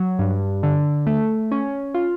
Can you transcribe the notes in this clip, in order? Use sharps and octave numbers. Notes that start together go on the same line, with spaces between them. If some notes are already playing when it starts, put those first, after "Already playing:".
Already playing: F#3
G2
D3
A3
C#4
F4